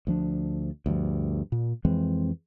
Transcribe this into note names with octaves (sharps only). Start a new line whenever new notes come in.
D2 F3 D4
D2 G2 F3
A#2
F2 E3 G#3 C4